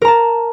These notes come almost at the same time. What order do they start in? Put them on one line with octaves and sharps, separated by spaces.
A#4 A#5 A5